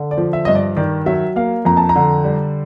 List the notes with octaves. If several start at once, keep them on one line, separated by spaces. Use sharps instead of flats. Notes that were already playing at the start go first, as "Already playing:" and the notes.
Already playing: D3
D5
F3
E5
G2 D#5
D5
D#3 D5
F#3 E5
A#3 F5
F2 A#5
A5
A#5
D3
G3